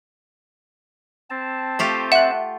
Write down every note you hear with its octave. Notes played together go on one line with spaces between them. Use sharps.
C4 A5
A3 F4 G4
E5 F#5 F#6